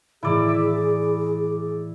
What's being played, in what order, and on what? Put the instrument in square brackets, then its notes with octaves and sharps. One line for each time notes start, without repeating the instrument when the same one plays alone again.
[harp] A2 D#3 E3 [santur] E4 D5 [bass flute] G#4
[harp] E5 B6